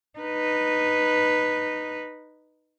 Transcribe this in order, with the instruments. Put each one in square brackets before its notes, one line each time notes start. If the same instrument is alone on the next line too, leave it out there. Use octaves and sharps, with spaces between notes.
[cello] D#4 B4